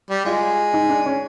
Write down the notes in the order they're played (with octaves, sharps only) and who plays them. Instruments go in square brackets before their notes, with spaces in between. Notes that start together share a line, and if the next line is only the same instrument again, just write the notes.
[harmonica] G3
[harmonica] G#3 [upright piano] F4
[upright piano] D#4
D4
C#4